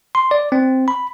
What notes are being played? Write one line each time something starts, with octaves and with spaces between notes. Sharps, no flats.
C6
D5
C4
B5